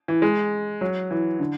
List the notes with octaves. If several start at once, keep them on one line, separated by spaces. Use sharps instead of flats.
E3
G#3
F#3
E3
D3